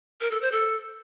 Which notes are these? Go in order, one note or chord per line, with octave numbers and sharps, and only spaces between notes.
A#4
A4
C5
A4